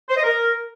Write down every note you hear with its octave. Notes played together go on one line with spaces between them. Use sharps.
C5
D#5
A#4